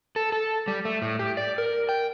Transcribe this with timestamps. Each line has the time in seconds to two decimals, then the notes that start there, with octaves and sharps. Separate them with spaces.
0.16 A4
0.32 A4
0.68 G3
0.85 A3
1.02 A2
1.19 G4
1.37 D5
1.58 A#4
1.89 G5